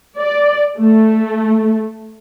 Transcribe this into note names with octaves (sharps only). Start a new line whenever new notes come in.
D5
A3